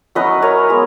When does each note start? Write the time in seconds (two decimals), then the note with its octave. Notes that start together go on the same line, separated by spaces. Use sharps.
0.15 F#3 C#4 E4 B4 D#5
0.42 A#4 C#5
0.69 G#3 B3 E4